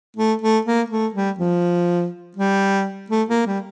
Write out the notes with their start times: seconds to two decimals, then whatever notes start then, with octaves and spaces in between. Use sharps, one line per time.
0.17 A3
0.42 A3
0.65 A#3
0.90 A3
1.14 G3
1.39 F3
2.37 G3
3.10 A3
3.29 A#3
3.47 G3